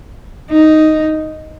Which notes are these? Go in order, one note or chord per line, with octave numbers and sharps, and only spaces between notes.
D#4